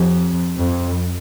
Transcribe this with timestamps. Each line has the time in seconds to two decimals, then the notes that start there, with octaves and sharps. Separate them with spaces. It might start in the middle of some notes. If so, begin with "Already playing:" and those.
Already playing: F2 F3 C4 G4
0.58 F2